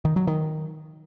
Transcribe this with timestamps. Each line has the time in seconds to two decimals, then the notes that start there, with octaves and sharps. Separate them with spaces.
0.05 D#3
0.16 F#3
0.27 D#3